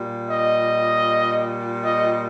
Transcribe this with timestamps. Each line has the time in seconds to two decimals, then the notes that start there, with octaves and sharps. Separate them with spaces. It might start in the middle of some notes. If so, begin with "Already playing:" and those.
Already playing: A#2 G3
0.29 D#5
1.82 D#5